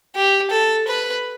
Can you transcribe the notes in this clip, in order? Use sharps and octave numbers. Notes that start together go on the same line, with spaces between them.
G4
A4
B4